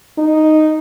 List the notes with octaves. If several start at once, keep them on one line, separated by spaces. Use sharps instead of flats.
D#4